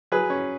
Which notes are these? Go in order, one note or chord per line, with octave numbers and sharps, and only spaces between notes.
F#3 G#4 B4
C#4